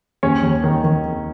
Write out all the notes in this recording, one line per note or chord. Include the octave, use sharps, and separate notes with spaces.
D#2 C#4 C#5
D#2
D#3
D#3